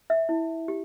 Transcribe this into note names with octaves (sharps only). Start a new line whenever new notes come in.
E5
E4
G4